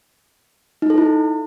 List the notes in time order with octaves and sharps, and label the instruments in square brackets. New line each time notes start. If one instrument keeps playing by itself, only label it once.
[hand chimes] D#4
A4
E4